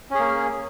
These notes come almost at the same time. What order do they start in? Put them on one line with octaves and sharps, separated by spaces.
C#4 G#4 A#3